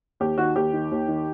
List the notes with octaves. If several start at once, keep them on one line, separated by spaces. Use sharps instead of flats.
D#2 G4
D#3 F#4
D#2 G4
D#3
D#2
D#3